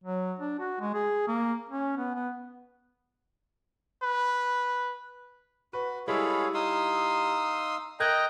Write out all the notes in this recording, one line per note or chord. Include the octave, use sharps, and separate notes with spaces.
F#3
D4
F#4
G#3
G#4
A#3
C#4
B3
B3
B4
F#4 B4
G3 G#3 E4 G#4 A4 C#5 F5 B5
D#4 F5 C6 D#6 E6
A#4 D#5 G5 A#5 F#6 G#6